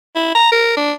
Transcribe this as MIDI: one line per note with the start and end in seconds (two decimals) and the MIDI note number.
0.16 0.32 64
0.35 0.52 82
0.52 0.77 70
0.77 0.93 62